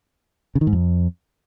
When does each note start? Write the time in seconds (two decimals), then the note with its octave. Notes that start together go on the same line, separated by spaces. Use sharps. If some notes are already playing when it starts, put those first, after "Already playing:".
0.55 C#3
0.61 D#3
0.67 G#2
0.73 F2